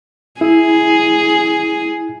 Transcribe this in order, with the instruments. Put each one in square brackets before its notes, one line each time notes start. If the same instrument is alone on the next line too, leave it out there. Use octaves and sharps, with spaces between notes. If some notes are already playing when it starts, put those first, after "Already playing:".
[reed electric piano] E4 [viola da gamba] G#4